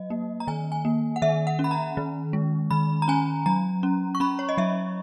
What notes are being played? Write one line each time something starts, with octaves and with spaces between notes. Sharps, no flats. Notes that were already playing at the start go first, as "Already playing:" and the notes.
Already playing: F#3 D#5
A#3
A#5
D#3 G#5
G#5
A#3
F#5
D#3 E5
F#5
C#4
B5
A#5
D#3
G#3
D#3 B5
A#5
C#4 G#5
F#3 A#5
C#4
C#6
C#4 B5
C#5
D#5
F#3 E5